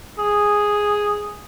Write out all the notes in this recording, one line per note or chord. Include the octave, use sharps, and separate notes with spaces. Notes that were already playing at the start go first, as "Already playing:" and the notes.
G#4